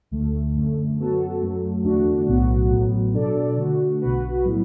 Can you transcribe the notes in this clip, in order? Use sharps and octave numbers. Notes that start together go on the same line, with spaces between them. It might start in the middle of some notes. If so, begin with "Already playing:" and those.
D2 D3 A3
F#2 D3 A3
F#2 F#3 B3 F#4 A4
F#2 F#3 A3
E2 D3 A3 D4 F#4
B1 A2 F#3 B3 F#4
A1 A2 F#3 B3
B2 F#3 D4 A4 D5
D3 A3 F#4
B1 B2 B3 F#4 B4
A2 F#3 B3 E4